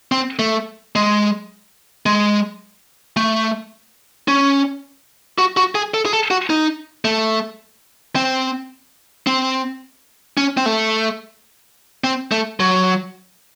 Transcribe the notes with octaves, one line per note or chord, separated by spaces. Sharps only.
C4
A3
G#3
G#3
A3
C#4
F#4
F#4
G#4
A4
G#4
A4
F#4
D#4
A3
C4
C4
C#4
C4
A3
C4
A3
F#3